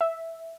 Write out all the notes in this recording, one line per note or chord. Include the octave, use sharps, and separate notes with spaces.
E5